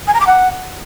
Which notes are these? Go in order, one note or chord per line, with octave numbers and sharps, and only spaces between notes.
G#5
A#5
D6
F#5